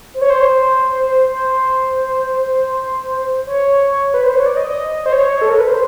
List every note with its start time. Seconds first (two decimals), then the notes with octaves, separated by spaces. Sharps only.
0.14 C5
0.21 C#5
0.30 C5
1.25 C5
3.46 C#5
4.14 B4
4.24 C5
4.35 C#5
4.46 D5
4.57 D#5
5.06 C5
5.13 C#5
5.42 A4
5.50 A#4
5.59 B4
5.68 C5